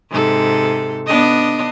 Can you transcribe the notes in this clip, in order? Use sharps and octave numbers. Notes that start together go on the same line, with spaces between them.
G#2 C3 A4
B3 D4 D#5